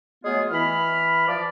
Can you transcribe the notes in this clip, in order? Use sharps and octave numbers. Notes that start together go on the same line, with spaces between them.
F#3 G#3 A3 B3 F4 G#4
E3 B5 F6
F3 D5